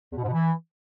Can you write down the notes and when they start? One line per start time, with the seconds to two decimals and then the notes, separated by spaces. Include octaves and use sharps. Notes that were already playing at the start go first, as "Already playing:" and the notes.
0.12 E2
0.17 B2
0.23 G#2
0.28 B2
0.33 E3